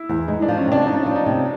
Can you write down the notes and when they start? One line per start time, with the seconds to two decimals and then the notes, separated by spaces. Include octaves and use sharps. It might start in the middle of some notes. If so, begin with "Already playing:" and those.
Already playing: E4
0.09 E2
0.28 G#3 D#4
0.42 D4
0.48 F3
0.58 C#4
0.67 C3 D4
0.87 F3 D#4
1.06 F3
1.16 D#4
1.26 C3